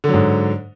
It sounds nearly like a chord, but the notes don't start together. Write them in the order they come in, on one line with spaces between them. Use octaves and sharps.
D3 F#3 G#2